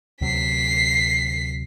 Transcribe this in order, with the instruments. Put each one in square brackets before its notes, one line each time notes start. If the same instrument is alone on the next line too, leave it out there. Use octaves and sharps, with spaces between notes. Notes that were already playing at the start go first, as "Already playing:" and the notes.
[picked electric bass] D2 C3 F#3 [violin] B6 C7